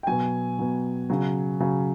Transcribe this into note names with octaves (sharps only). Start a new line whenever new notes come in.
G5
B2 F#3 G#5
B2 F#3
C#3 F#3
C#3 F#3